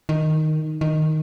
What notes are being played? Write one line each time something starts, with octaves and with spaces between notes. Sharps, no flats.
D#3
D#3